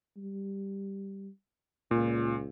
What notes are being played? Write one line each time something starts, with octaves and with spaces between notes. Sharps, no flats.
G3
C#2 A#2